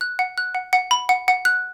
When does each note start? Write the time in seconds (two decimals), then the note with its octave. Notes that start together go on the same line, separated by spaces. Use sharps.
0.01 F#6
0.19 F#5
0.38 F#6
0.55 F#5
0.73 F#5
0.91 B5
1.09 F#5
1.28 F#5
1.45 F#6